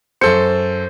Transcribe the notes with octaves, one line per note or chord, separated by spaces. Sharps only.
F#2 A4 C5 C#7